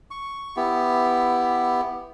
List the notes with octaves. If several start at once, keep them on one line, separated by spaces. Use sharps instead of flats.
C#6
B3 E4 G4